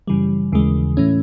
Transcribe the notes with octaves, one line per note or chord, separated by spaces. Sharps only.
F#2 C#3 E3 G3
D#2 C#3 E3 G#3
A2 E3 A3 C#4